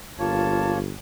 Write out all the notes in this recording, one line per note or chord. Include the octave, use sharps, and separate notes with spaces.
G1 A#3 F4 C#5 A5